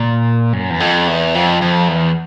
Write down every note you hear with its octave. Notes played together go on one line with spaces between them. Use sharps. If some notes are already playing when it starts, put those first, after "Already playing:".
Already playing: A#2
F#2
E2
F2
E2
F2
F2
E2